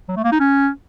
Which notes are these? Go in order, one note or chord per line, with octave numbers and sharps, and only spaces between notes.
F#3
A3
A#3
D#4
C#4